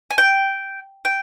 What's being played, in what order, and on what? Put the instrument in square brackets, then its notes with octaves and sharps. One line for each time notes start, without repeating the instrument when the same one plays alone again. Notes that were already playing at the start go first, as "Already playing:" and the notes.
[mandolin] G#5
G5
G5